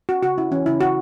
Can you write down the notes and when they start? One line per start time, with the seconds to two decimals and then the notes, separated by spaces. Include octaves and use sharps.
0.09 C#4 F#4
0.23 C#3 F#4
0.38 C#4 E4
0.51 E3 C#4
0.66 C#3 E4
0.81 C#3 F#4